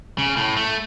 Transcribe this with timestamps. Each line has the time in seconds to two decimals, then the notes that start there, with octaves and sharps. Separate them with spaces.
0.18 C#3
0.37 A2
0.57 A3